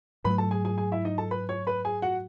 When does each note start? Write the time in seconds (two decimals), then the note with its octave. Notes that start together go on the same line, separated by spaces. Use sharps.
0.24 G#2 F#3 A3 B4 B5
0.38 A4 A5
0.51 G#4 G#5
0.65 G#4 G#5
0.78 G#4 G#5
0.92 E4 E5
1.05 D#4 D#5
1.18 A4 A5
1.31 B4 B5
1.49 C#5 C#6
1.67 B4 B5
1.85 G#4 G#5
2.02 F#4 F#5